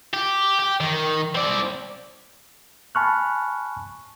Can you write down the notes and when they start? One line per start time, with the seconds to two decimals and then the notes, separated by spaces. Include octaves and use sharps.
0.14 G4
0.59 G4
0.80 D#3
1.35 C4 D5
2.95 G#5 A5 B5 C#6 F6 F#6